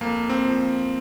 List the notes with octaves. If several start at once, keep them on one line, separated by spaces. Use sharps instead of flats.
F2 A#3
C4
F3